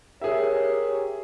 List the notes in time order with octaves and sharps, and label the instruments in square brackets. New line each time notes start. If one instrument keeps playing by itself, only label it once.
[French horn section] G4 A#4 C#5 [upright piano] G#4 E5